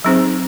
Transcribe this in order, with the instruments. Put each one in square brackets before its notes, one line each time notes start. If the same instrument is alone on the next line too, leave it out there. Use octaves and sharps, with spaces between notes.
[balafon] F#3 C4 D#4 G#4 C5